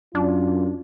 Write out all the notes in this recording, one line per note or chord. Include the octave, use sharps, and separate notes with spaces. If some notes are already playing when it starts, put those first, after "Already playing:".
F#2 D4 F4